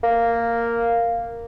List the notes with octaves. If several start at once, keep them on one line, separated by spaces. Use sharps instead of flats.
A#3